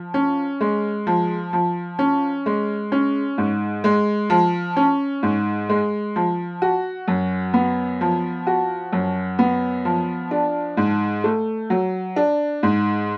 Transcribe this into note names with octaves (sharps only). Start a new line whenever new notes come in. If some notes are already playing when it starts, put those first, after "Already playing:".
Already playing: F3
C#4
G#3
F3
F3
C#4
G#3
C#4
G#2
G#3
F3
C#4
G#2
G#3
F3
F#4
F#2
B3
F3
F#4
F#2
B3
F3
D4
G#2
A3
F#3
D4
G#2